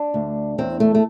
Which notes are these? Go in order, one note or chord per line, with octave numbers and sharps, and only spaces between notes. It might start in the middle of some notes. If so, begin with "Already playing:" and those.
Already playing: D4
D2
E2 C4
A3
A3